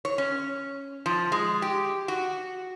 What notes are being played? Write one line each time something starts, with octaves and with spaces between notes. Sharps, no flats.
C#5
C#4
F3
G#3
G4
F#4